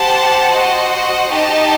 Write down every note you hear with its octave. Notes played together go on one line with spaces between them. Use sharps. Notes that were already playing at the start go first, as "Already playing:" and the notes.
Already playing: G4 C5 F#5 A5
F#4 C5 D#5 F#5
D#4 G4 D#5 A5